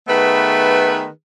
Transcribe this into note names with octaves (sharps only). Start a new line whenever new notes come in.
D#3 A3 B3 G#4 B4